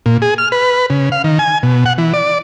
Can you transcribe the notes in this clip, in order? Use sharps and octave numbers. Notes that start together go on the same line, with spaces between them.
A#2
G#4
F6
B4
C#3
F5
D#3
G#5
B2
F#5
E3
D5